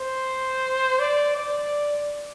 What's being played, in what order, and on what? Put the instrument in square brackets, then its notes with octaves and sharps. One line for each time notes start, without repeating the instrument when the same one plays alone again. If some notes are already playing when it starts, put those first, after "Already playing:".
Already playing: [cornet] C5
D5
D5